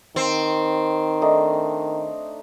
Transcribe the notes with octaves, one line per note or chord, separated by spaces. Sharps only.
D#3 C4
A3 D4 D#4